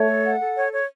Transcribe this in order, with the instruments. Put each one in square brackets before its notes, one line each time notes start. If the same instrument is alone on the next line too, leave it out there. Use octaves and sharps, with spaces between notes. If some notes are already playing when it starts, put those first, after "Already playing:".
Already playing: [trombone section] A3 [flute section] C#5
[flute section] A4
F#5
A4
C#5
C#5